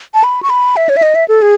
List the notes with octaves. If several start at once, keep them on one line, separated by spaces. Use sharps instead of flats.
A5
B5
C#6
B5
E5
C#5
E5
D#5
E5
A4
G#4